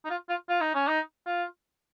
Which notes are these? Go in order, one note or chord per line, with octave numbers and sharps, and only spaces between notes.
D#4
F4
F4
F4
D#4
C#4
D#4
F4